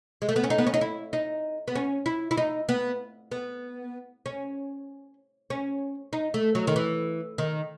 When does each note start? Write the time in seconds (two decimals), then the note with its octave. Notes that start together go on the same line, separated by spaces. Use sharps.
0.22 G#3
0.29 A3
0.36 B3
0.44 C#4
0.50 D#4
0.58 B3
0.67 C#4
0.74 D#4
0.81 E4
1.13 D#4
1.68 B3
1.75 C#4
2.06 E4
2.31 E4
2.37 D#4
2.69 B3
3.32 B3
4.26 C#4
5.50 C#4
6.13 D#4
6.34 A3
6.55 F#3
6.67 D#3
6.76 E3
7.38 D#3